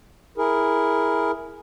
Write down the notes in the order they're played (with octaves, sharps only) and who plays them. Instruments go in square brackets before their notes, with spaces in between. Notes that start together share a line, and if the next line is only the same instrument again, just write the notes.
[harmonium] E4 G#4 A#4